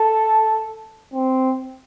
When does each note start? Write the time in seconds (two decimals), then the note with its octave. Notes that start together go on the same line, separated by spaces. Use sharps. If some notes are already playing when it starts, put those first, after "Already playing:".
Already playing: A4
1.14 C4